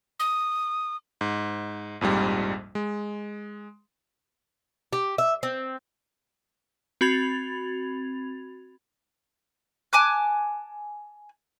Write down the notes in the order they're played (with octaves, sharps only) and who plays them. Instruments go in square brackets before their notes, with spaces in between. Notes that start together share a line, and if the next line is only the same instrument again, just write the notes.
[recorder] D#6
[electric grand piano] G#2
A#1 F2 G#2 G3
G#3
[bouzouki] G4
E5
C4
[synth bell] C4 F#4 B5 G#6 A6 F7
[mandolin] G#5 A5 D6 F#6